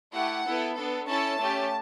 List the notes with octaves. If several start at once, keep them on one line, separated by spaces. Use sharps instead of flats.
A3 E4 G4 F#5
B3 E4 A4
B3 D4 A4
C#4 E4 A4 A5
A3 C#4 G4